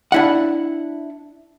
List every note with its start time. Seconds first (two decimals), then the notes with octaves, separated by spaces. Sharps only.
0.12 D4 E4 F#5